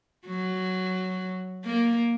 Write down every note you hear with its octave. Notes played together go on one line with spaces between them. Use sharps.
F#3
A#3